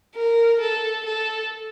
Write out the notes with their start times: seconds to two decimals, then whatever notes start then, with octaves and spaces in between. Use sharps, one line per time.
0.15 A#4
0.60 A4
1.05 A4